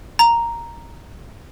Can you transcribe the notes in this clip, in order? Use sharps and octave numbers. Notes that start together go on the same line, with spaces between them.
A#5